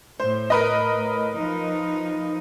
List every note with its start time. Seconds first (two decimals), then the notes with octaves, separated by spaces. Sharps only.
0.20 A2 C5
0.50 A#4 B4 D#5
1.35 F3 D#4